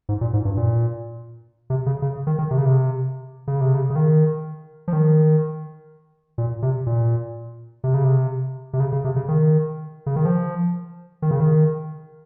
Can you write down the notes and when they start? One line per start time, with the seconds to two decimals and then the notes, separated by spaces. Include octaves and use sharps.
0.09 G#2
0.21 A#2
0.33 G#2
0.45 G2
0.57 A#2
1.70 C3
1.86 C#3
2.02 C#3
2.27 D#3
2.39 D#3
2.51 C3
2.58 C#3
2.65 C3
3.47 C#3
3.61 C3
3.74 C#3
3.90 C#3
3.96 D#3
4.88 F3
4.93 D#3
6.38 A#2
6.62 C3
6.87 A#2
7.84 C3
7.94 C#3
8.04 C3
8.73 C3
8.80 C#3
8.92 C#3
9.04 C3
9.16 C#3
9.28 D#3
10.06 C#3
10.16 D#3
10.25 F3
11.22 D#3
11.31 C#3
11.40 D#3